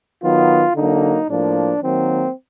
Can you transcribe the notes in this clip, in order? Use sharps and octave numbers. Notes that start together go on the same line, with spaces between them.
D#3 F#3 B3 F4
D3 F#3 A#3 D#4
A2 F3 A#3 D4
D#3 F#3 A#3 C4